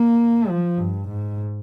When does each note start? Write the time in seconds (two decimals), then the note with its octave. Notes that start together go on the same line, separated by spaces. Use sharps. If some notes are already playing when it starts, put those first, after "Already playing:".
Already playing: A#3
0.48 F3
0.77 G2
1.08 G#2